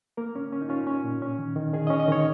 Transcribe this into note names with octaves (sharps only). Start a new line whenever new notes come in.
A#3 A#4
C#4
C#4
D#4
C#4 F4
C#4
A#2
C#4
D#3
D#3
D#3 G#4
D#5
C#4 C#5
D#5
D#3 C#5